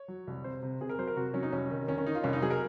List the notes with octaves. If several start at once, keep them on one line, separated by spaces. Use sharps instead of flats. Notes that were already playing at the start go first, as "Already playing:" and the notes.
Already playing: C#5
F#3
C2
C3 C5
C3
C3 G#4
A#4
F#3 C5
A#4
C3 F#4
F#3 C#4
D#4
C2 C#4
D#3
D#3 C#4
C#4
D#3 D#4
F4
C2 C#4
D#4
F#3 G#4
A#4